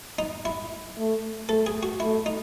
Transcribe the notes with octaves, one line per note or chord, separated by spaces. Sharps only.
D#4
E4
A3
A3 A4
G#4
F#4
A3 E4
D#4